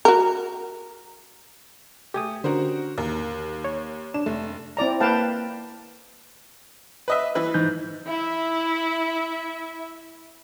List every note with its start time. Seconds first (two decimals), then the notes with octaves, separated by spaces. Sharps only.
0.05 F#4 A#4
2.14 A3 G4 G#5 D#6
2.44 D3 C#4 F#4 A#4 C5
2.98 D#2 A#4
3.64 C#5
4.14 D4 E7
4.26 F1 A3
4.77 C4 E4 D5 A#5
5.00 A#3 B4 F5 G5 A5
7.08 B4 D#5 E5
7.35 E3 B4
7.54 G#2 E3 D#4 G6
8.06 E4 E5